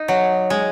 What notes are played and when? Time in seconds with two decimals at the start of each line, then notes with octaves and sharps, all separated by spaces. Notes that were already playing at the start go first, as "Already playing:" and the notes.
Already playing: D#4
0.08 F#3
0.50 G#3